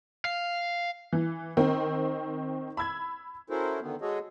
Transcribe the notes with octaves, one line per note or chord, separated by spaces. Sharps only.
F5
E3
D#3 C4
B5 E6 G#6
C#4 E4 F#4 A4 A#4 C5
D3 D#3 B3
G#3 F#4 G#4 A4 C#5 D#5